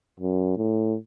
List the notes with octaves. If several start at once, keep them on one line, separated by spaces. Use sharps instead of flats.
F#2
A2